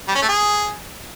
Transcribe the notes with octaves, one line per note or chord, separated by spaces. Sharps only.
G3
C#4
A3
G#4